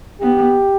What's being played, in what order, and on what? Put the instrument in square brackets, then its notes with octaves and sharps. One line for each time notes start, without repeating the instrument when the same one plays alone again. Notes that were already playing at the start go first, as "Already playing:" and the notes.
[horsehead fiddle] B3 [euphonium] G4